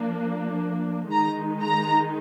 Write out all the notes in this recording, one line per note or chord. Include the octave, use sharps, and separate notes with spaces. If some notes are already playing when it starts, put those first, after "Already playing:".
Already playing: F3 A#3 D4
D#3 G#3 D#4 A#5
A#5